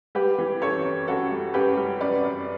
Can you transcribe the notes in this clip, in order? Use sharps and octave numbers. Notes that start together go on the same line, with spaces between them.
G3 G4 B4
E3
F#2 A4 C#5
F#2
F#2 F#4 A4
G3
F#2 G4 B4
G3
F#2 B4 D5
F#2